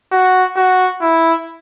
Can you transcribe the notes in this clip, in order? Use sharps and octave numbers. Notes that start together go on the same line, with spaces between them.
F#4
F#4
E4